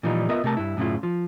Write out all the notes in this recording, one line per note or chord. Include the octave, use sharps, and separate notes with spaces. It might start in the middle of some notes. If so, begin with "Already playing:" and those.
A#2 E3 F3 G3 D#4
B3 F4 A#4 D#5 E5
C3 A3 A#4 A5
G2 E4
F#2 A2 C#3 E4 F4
F3